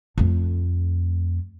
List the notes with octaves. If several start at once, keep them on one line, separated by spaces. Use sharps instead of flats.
F2 A3